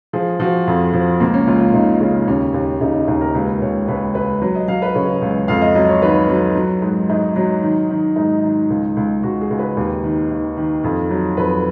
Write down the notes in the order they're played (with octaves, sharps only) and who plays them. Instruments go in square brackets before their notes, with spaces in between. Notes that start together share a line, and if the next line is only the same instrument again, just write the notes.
[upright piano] F3 G#4
F3 F#4
F2
F3
C#2 A#3
C#4
C#2 F4
F4
C#2 D#4
C#3 C#4
D#2 C#4
D#2
C#3 D#4
D#4
D#2 D#4
A#4
C#2 B4
C#2 C#5
C#2 B4
C#2 B4
F#3
D#5
F#3 F5
B4
C#3 C#5
C#2
F2 F5
D#5
F#3 D#5
C#5
D#3 B4
F#3
F#3
G#2
G#2 D#4
F#3
D#3
D#3
G#2 D#4
D#3
C#2
C#2
C#2 F#4
G#4
C#2
B4
D#2
D#3
D#3
D#3
F2
F#3
F2 B4